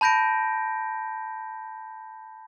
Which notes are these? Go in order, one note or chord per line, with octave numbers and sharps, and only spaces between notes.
A5 B5 G6 A#6 D7